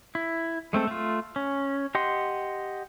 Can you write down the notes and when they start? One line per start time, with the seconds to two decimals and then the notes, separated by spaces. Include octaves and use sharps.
0.15 E4
0.73 G#3 A3 C4 A4
0.87 A3 F4
1.36 C#4
1.95 G4 D#5 F#5 C6